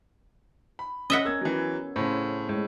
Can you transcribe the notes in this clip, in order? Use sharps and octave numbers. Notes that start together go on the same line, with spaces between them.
B5
C#4 D#5 E5 F#5
B3 A#4 E6 G#6
E3 F#3
A2 C#3 C5
A2 G#3